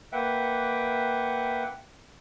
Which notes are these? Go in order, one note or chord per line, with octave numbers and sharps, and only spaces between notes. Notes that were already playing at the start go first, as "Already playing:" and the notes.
A#3 B4 E5 F#5 G5